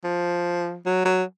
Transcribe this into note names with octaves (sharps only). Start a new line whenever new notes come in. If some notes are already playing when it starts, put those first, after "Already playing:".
F3
F#3
F#3